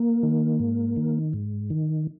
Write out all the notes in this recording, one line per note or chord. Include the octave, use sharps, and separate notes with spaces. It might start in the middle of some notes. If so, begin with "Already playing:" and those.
Already playing: A#3
D#3
G#2
D#3
G#2
D#3